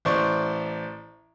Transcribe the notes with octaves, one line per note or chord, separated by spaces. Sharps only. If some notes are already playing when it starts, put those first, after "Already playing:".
A1 C5 D5 C#6